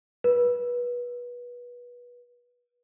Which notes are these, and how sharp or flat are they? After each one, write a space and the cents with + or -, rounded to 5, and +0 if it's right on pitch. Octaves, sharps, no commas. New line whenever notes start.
B4 -25